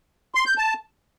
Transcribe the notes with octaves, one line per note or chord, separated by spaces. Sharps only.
C6
G6
A5